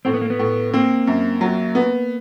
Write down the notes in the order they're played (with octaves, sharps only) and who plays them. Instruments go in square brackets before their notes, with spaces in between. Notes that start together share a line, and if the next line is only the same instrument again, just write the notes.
[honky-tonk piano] A2 [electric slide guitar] C4
[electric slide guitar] B3
A#3
B3
[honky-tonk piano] A2
[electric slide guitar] A#3 [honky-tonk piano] C4
[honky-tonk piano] F#2
F#3
B3